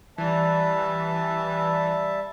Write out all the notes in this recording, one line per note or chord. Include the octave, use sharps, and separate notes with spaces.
E3 G3 E5 A5